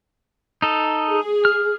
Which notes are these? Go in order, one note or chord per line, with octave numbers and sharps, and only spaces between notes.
D#4 A4
G#4
F6